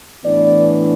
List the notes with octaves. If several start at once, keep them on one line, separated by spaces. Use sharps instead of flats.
A2 E3 B3 D4 D5